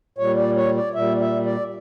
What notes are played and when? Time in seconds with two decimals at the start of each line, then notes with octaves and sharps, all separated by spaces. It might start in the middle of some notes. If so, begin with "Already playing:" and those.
0.18 A#2 G3 C#5
0.37 D5
0.56 C#5
0.76 D5
0.95 A#2 G3 E5
1.20 E5
1.46 D5